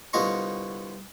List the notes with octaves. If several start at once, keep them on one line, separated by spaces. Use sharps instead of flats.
C2 D3 B3 F4 D#5 C#6